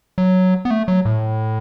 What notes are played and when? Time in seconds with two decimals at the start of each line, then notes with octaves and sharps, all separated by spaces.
0.18 F#3
0.65 B3
0.71 A3
0.88 F#3
1.05 A2